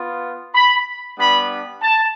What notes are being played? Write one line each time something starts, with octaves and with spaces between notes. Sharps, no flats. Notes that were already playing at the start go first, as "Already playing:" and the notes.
Already playing: B3 F4
B5
G3 B3 D4 B5
A5